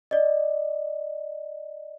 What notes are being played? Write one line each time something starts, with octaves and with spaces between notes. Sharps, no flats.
D5 D#5